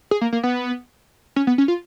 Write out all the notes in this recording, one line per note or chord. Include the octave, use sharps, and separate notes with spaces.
G#4
A#3
A#3
B3
C#4
B3
C#4
F4